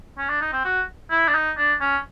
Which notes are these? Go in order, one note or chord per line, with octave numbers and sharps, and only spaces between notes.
C#4
D4
D#4
C4
F#4
E4
D4
D#4
D4
C#4